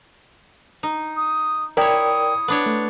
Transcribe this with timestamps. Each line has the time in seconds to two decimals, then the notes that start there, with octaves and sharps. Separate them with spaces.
0.83 D#4
1.17 D#6
1.77 E4 A#4 C#5 D5 G5 D#6
2.48 B3 D4 C#5
2.66 A3